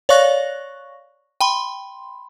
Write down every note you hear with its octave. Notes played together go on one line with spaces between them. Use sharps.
C#5 D5 F5 C#6 F#6 A#6
G5 B5 C6